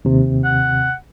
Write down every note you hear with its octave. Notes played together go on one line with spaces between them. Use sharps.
D#2 C3
F#5